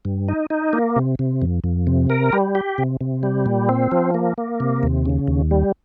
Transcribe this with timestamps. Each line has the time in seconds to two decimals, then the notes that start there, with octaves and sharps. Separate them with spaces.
0.05 G2
0.28 D#4
0.50 D#4
0.73 A#3
0.96 C3
1.19 C3
1.42 F2
1.64 F2
1.87 C3
2.10 A#4
2.33 G3
2.55 G4
2.78 C3
3.01 C3
3.23 G3
3.46 A#2
3.69 C4
3.91 F3
4.14 A#3
4.38 A#3
4.60 C3
4.83 D#2
5.06 C#3
5.28 D#2
5.51 G3